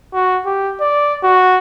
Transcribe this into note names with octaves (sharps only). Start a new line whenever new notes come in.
F#4
G4
D5
F#4